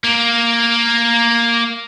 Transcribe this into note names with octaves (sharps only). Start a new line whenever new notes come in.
A#3